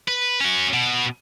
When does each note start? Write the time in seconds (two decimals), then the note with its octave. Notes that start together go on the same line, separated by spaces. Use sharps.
0.08 B4
0.41 C#4 F#4
0.74 B2